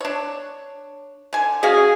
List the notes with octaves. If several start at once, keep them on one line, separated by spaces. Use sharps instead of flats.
D4 C#5
D3 G#5
C#4 F#4 G#4 F5